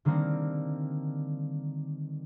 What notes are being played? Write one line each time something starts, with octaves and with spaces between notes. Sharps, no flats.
D3 D#3 G3 A#3 C4